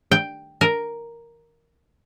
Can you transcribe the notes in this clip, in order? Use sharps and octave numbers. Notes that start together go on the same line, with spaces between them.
G5
A#4